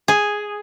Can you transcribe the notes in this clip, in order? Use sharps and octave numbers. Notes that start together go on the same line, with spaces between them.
G#4